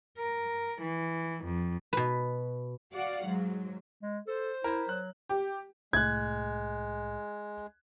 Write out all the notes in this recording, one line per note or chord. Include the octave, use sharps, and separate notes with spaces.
A#4
E3
F2
B2 B4
F#4 D5 F5 F#5
G#2 F#3
G#3
A4 C5
E4 A#4
F#3 F#6
G4
C2 A2 G#3 F#6 G#6